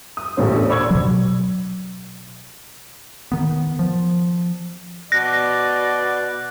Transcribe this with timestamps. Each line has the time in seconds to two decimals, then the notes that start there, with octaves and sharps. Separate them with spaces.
0.17 D#6
0.37 A1 E2 A#2 A3 C#4 C5
0.53 D4 A4
0.68 C5 D5 B5 C#6 E6 G#6
0.91 B2 F#3
3.32 D#3 B3
3.79 F3
5.12 B2 D5 F#6 A#6